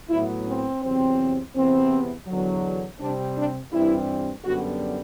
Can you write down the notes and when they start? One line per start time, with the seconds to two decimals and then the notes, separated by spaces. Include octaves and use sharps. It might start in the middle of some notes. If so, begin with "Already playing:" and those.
0.10 A2 F#3 B3 E4
0.47 C4
0.83 E2 C3 F#3 C4
1.55 E2 C3 E3 B3 C4
2.28 E2 D3 F#3
3.00 C3 G3 C4 D4
3.36 D4
3.72 G2 E3 G3 C4 E4
4.45 F#2 D3 G3 B3 F#4